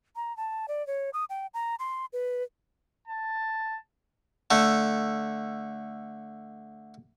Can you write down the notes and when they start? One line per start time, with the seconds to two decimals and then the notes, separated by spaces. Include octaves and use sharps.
0.16 A#5
0.37 A5
0.68 D5
0.87 C#5
1.13 D#6
1.30 G5
1.54 A#5
1.79 C6
2.13 B4
3.07 A5
4.51 D3 A3